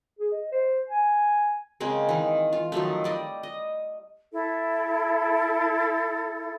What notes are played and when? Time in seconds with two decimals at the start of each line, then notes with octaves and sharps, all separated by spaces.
0.19 G#4
0.32 D#5
0.52 C5
0.89 G#5
1.80 C#3 G#3 A#3 C4
2.09 D#3 E3
2.53 F4
2.72 D#3 F3 F#3 A3
3.04 G3 D5 D#5
3.43 D#5
4.31 E4 A4